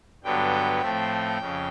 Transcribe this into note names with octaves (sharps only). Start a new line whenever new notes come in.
G2 D3 F#3 B3 G5
A2 F3 A3 C4
F2 C#3